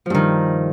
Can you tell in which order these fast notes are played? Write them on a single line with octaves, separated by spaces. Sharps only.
F3 G2 D#3